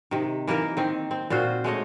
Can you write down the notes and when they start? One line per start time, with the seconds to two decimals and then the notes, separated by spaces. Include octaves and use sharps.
0.11 C3 D#3
0.48 E3 A#3 D#4 A#4
0.77 D#3 C4
1.11 C4
1.30 A#2 F4 F#4 C5
1.64 G#3 A3 C#5 D#5